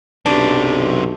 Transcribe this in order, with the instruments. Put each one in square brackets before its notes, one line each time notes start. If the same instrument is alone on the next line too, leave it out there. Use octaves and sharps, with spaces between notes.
[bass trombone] B1 [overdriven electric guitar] F#2 C3 [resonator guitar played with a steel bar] D4 [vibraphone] G4 B4